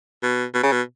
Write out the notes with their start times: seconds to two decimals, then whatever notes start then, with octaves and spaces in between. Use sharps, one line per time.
0.23 B2
0.54 B2
0.63 C#3
0.72 B2